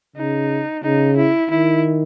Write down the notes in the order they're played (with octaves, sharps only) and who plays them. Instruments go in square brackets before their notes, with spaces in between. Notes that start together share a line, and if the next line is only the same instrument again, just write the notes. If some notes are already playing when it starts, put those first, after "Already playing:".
[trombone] C#3 [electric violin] D#4
[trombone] C#3 [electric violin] D#4
[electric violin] E4
[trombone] D#3 [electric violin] E4